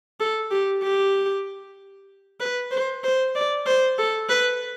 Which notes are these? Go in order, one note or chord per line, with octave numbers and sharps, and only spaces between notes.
A4
G4
G4
B4
C5
C5
D5
C5
A4
B4